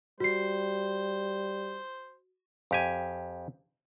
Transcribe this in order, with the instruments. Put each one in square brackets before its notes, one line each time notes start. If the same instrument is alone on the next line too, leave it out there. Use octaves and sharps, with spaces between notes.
[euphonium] G3 [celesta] F#4 C7 [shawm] C5
[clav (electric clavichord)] F2 G4 G#5